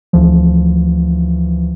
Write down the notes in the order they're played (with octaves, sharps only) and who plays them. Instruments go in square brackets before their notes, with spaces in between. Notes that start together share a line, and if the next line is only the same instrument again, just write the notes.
[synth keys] D2 E3 F3